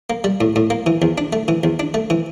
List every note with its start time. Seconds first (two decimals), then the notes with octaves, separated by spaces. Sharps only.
0.10 A#3
0.24 G3
0.41 A2
0.56 A2
0.70 A#3
0.86 E3
1.02 E2
1.18 D4
1.33 A3
1.48 E3
1.64 E2
1.80 D4
1.94 A3
2.10 E3